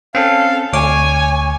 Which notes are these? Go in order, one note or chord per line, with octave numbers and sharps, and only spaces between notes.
C4 C#4 A4 F5
D2 C#5 G#5 D6